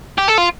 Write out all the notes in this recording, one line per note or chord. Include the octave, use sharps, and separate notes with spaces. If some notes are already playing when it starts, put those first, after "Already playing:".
G4
A4
F4